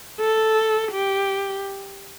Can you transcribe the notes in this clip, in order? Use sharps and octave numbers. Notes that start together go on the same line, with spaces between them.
A4
G4